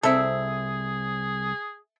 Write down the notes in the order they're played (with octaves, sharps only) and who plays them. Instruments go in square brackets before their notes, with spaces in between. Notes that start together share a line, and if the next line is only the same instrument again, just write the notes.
[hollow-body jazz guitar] C2 C4 [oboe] G#4 [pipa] A4 E5